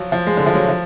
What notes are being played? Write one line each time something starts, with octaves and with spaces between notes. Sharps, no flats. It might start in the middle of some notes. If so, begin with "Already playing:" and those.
Already playing: F3 F#3
F3
G#3
D3
F3
F#3
F3